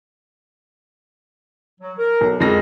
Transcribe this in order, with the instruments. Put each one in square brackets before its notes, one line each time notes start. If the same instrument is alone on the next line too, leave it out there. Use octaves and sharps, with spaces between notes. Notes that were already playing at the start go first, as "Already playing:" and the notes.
[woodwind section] F#3
A#4
[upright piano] B1
[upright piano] F2 G#3 A#6 [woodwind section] D4 A#4